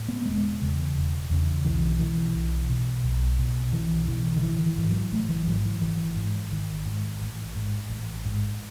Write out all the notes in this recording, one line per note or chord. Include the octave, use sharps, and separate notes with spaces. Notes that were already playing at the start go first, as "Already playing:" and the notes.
Already playing: A2
B3
E1 G#3
E2 C#3
E1
E2 C#3
B1 E3
B2 E3
B1
B2
B1
B2
B1 E3
B2 E3
D#3
A1 E3
E3
G#2
F#3
A1 A3
E3
G#2 F#3
E3
G#1 E3
G#2
G#1 D#3
G#2
A1
G#2
A1
G#2